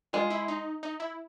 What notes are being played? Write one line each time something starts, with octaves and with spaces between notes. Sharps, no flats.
G#3 F4
E4
D#4
D#4
E4